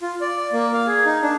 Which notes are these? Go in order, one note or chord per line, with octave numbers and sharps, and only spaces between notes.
F4
D5
A#3
F5
G#4
D#4
D4